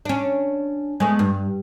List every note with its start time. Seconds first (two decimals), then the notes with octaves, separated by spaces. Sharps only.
0.05 C#4 D4
1.00 G#3 A3 B3
1.19 G2